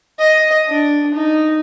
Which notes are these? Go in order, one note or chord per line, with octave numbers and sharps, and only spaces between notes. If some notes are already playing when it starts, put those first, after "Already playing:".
D#5
D4
D#4